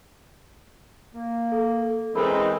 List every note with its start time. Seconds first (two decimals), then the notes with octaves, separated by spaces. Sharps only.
1.14 A#3
1.52 A4
2.15 E3 G#3 A3 C4 C#4 D#4 A#4 B5